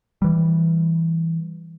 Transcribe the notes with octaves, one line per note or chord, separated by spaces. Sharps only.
E3 G3